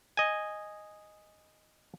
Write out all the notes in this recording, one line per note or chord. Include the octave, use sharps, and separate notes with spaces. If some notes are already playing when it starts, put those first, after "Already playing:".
D#5 G#5